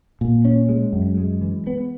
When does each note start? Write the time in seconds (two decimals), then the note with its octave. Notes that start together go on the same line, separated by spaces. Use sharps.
0.21 A#2
0.45 C#4
0.69 G#3
0.93 F#2
1.18 G#3
1.42 E3
1.67 B3